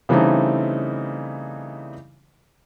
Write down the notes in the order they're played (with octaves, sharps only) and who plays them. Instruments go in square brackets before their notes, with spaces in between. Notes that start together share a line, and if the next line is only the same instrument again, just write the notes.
[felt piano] C#3 E3 G3 A3 C4 D#4